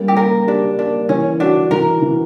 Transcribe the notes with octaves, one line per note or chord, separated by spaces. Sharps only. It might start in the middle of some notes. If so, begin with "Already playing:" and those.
Already playing: G3 A#3 C#4
G4
A#3 A#4
D4 G4
A#3 D4
E3 C#4
D4 F#4
E3 A#4
E3